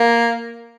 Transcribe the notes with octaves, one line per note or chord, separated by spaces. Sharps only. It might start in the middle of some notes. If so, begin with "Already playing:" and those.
Already playing: A#3